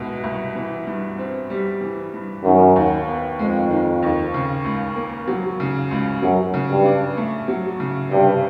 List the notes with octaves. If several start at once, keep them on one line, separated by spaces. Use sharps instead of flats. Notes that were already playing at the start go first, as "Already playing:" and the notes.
Already playing: C2 B2 G#3
C2
E3
G2
C4
G3
E3
G2
F#2 D#3
D#2
B3
F2 G#3
D#3
D#2
C#3
C#2
A#3
F#3
C#3
C#2
F#2 F#3
C#3
G2
D4
A3
F#3
C#3
G2 C3